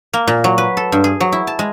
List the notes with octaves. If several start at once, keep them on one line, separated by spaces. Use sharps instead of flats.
A#3
A#2
F#3
B4
A4
G2
G#4
F#3
E4
A5
G#3